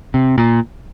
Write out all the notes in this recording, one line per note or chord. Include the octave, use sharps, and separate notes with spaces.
C3
A#2